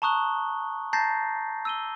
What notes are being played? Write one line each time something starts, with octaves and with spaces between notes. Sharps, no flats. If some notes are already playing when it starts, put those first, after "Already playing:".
A5 A#5 C#6 D#6 F#6 G7
A5 A#5 G6 A6 A#6 C7
E6 D#7 G7